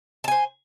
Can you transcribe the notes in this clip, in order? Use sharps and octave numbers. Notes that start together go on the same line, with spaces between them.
C5 G#5 A5